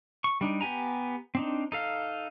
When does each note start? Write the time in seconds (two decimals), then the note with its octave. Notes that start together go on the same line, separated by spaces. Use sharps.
0.24 C#6
0.41 G3 D4 D#4
0.61 B3 G4 G#5 A#5
1.35 C4 D4 D#4
1.72 D#4 A4 F5